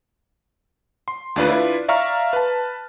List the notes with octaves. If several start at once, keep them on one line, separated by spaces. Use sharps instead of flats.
C6
D#2 A3 D4 F4 B4 D#7
D4 E4 F4 B4
D5 E5 F5 A#5 C#6 F6
B4 A5